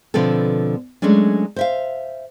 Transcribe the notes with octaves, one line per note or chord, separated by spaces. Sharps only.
B2 D3 F3 B3 C4 A4
F#3 G#3 A3 C#4 D4
C5 E5 F5